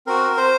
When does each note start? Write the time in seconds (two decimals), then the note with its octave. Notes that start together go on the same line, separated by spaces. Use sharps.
0.07 C4 F#4 A#4
0.37 C5